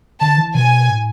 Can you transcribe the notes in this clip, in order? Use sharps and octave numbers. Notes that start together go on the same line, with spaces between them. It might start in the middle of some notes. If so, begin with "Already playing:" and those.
D3 A5
E3
B2 G#5
A2